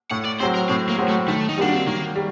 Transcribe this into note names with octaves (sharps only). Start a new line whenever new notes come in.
A2 F#5
D5
F#3 C4 C5
A#4
A2 C4
A#3
F#3 C4
A3
D#3 A3
D#4
G3 A#3 D4 F#4
C4
D#3 A#3
G3